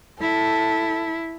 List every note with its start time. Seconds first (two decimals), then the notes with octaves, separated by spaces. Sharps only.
0.22 E4 A4